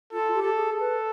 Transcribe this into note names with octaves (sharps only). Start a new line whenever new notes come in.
F4 A4
G4
A4
G#4
A4
B4